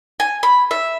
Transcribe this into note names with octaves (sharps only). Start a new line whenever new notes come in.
G#5
B5
E5